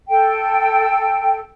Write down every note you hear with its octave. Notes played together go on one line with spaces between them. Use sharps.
A4 G5